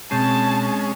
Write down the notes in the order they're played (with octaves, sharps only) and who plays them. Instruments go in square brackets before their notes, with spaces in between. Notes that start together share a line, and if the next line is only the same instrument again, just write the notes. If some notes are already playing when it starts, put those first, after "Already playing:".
[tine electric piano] B2 G6 C7 [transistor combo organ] G#3 C#4 [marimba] C4 [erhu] A5